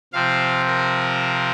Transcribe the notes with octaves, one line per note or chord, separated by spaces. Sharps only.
C3 F3 C4 F5
A#4